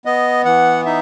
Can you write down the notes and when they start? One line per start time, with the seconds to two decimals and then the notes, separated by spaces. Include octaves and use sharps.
0.05 B3 D#5
0.45 E3 F#5
0.85 D#4 E5